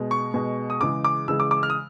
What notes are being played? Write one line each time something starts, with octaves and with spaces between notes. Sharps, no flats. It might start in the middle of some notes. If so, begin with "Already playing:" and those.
Already playing: B2 G#3
C#6
B2 G#3
D#6
C#3 E3 G#3 D6
D6
C#3 E3 G#3 E6
D6
D6
F6
D#6